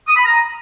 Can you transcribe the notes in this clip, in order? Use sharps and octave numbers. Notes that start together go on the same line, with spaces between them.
D#6
B5
A#5